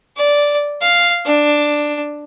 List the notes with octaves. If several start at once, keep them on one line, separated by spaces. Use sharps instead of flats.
D5
F5
D4